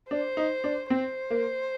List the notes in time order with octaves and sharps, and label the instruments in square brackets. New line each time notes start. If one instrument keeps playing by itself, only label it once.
[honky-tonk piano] D4 [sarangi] C5
[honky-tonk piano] D#4
D4
[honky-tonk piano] C4 [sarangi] C5
[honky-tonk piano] A#3